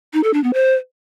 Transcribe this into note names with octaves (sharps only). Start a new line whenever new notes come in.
D#4
A4
D4
B3
C5